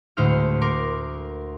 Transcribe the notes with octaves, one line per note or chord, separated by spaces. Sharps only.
D2 A2 G#3 C5 F6 C#7
A#4 C6 D6